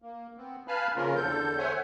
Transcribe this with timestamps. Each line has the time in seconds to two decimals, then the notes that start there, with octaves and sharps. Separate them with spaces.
0.02 A#3
0.38 B3 C4
0.68 B4 F5 G#5 A5 B5 F6
0.96 C#3 F3 A#3 C#4 F4 A#4
1.16 E2 D3 A4 G6
1.58 C5 C#5 E5 F#5 G#5